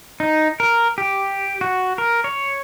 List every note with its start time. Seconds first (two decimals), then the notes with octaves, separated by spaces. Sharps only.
0.20 D#4
0.60 A#4
0.98 G4
1.61 F#4
1.98 A#4
2.24 C#5